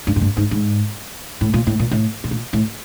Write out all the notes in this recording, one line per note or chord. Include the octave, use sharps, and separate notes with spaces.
G2
G#2
G2
G#2
G#2
A2
A#2
A2
A#2
A2
A2
A#2
A2